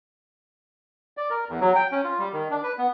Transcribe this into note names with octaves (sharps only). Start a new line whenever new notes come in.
D5
A#4
E2
F#3
G5
C#4
F4
G3
D#3
D4
B4
B3